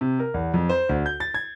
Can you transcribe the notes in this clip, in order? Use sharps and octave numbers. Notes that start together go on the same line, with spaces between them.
C3
A#4
E2
F2
C5
D2
G6
A6
G#6